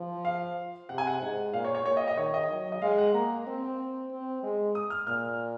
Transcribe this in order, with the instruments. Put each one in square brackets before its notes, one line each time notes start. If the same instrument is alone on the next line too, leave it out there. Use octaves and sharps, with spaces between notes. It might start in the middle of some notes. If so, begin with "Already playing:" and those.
Already playing: [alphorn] F3
[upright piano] F5
[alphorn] C3 [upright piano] F#5
[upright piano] G#5
F#5
[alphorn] G#2
[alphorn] A#2 [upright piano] F5
[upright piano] C#5
C#5
[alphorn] A#2 [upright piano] C#5
[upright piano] D#5
D#5
[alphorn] D#3 [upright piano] C#5
[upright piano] D#5
[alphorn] F#3
[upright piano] D#5
[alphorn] G#3 [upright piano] F5
[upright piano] F#5
[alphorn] A#3 [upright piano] A#5
[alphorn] C4
C4
G#3
[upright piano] D#6
F6
[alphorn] A#2 [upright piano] F6